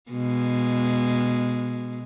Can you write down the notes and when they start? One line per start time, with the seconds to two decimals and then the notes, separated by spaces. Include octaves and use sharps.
0.11 B2 G#3